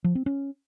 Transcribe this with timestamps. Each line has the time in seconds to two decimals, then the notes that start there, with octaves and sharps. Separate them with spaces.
0.04 F3
0.15 C4
0.26 C#4